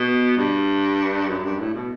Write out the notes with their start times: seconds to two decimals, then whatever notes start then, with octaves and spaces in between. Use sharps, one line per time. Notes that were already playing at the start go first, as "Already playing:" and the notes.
Already playing: B2
0.37 G2
1.28 F#2
1.44 G2
1.60 A2
1.74 B2